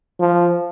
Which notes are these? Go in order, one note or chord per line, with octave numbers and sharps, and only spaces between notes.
F3